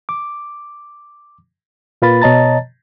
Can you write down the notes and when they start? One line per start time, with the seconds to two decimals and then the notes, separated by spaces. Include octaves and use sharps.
0.09 D6
2.02 A#2 A#3 F4 B4 B5 A6
2.22 B2 C#5 D#5 A5 A#5 A6